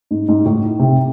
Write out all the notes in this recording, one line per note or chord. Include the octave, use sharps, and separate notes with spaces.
G#2
G#2
A2
C3